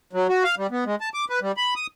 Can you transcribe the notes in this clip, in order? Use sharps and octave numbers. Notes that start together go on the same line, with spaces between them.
F#3
F#4
F5
G3
B3
G#3
A5
D6
B4
G3
B5
D#6